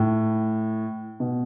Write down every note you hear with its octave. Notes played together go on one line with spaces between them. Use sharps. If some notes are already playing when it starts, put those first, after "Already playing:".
Already playing: A2
B2